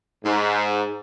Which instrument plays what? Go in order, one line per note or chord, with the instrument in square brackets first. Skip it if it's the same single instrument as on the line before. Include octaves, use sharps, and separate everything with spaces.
[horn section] G#2